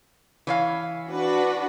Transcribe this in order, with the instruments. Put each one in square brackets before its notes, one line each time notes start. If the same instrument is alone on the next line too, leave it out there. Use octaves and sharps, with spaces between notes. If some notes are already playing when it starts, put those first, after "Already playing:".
[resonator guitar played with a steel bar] E3 C#5 F5
[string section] D4 F#4 B4